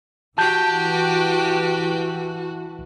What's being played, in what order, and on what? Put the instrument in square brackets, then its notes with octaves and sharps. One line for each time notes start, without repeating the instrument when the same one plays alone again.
[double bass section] E3 [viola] F#4 [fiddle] G4 G5 [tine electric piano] A5 G6